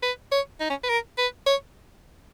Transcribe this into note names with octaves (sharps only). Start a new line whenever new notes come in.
B4
C#5
D#4
C#4
B4
A#4
B4
C#5